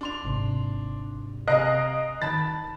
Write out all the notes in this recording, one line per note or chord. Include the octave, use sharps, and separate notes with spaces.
D4 C6 F7
G#1 G#2 C3
C3 D#5 F5 G#5 A#5 F#6 A#6 D7
D#3 A5 B5 A6